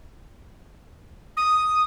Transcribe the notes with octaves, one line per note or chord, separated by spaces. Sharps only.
D#6